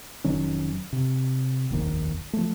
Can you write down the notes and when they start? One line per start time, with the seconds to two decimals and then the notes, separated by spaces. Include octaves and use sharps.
0.24 F1 D#3 F#3 C#4
0.93 C3
1.70 F1 A#1 D#2 D#3
2.33 F3 A3